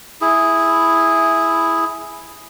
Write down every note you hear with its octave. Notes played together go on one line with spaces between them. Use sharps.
E4 G#4